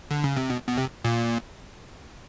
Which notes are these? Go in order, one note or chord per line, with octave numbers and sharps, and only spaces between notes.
D3
C#3
C3
B2
B2
C3
A#2